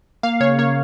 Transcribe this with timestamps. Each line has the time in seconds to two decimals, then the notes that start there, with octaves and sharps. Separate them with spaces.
0.23 A#3 F5
0.40 C#3 C#5
0.59 A#3 C#5